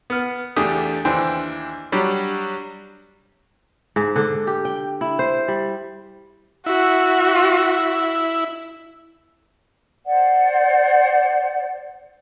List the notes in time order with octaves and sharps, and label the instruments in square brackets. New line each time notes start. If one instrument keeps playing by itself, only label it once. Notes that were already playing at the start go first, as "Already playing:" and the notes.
[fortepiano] B3 F6
E2 A3 D4 G4 D#6
D#2 E3 D4 C5 G5
F#3 G3 D4 G4
[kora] G#2
D3
G4
G5
E4
C5
G3
[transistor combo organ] E4 [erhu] F#4
[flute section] C5 D5 F#5